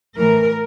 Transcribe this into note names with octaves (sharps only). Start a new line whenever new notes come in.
A2 E3 A#4